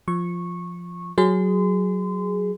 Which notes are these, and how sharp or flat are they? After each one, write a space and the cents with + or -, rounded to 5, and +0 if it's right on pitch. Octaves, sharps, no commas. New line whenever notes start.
F3 +0 C#6 -15
F#3 +5 G#4 +0 C6 -30